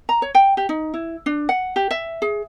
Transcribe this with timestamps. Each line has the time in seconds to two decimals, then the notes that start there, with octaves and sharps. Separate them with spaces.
0.09 A#5
0.22 C#5
0.35 G5
0.57 G4
0.69 D#4
0.94 E4
1.26 D4
1.49 F#5
1.76 G4
1.91 E5
2.22 G#4